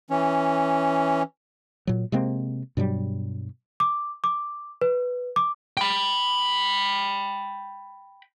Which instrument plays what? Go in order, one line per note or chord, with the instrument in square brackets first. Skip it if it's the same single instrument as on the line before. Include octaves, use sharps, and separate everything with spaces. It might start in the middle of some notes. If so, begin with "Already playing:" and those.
[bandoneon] E3 C#4
[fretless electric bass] A#2 F#3
C3 G#3 A#3 C4
G2 B2 F#3 G3
[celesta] D6
D6
B4
D6
[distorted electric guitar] G5 B5